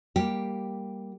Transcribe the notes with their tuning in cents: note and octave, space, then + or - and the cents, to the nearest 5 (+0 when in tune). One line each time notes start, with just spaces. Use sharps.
G3 +0 A#3 +0 G4 +0